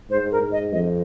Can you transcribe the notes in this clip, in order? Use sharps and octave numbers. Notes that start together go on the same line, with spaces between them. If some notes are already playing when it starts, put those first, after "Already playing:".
G#2 C5
A#4
G#2
D#5
F2 D#5